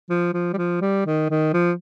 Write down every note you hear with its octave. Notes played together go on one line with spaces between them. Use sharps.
F3
F3
G3
F3
G3
D#3
D#3
F3